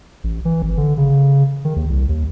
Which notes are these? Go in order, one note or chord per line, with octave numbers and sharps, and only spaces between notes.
A1
E3
G#1
D3
C#3
D#3
D#2
C2
D#2